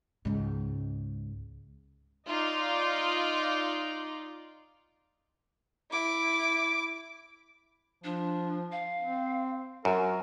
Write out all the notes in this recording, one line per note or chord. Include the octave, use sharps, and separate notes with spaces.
C#2 G#2
D#4 F4 D5
E4 D6
F3 D4
F5
C4
F#2 F#4 A#4